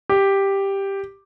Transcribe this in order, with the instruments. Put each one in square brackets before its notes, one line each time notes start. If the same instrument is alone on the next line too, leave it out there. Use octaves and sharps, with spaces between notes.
[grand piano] G4